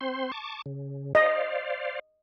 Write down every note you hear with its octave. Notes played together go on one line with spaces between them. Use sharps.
C4 C5 C6
A5 C#6 D6
C#3
C5 D5 D#5 F5